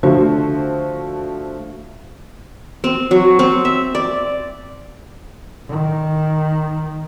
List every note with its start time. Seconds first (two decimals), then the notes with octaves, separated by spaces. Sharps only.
0.03 D3 F3 A3 F#4 C5
2.84 C4
3.11 F#3
3.39 C4
3.65 E5
3.95 D5
5.69 D#3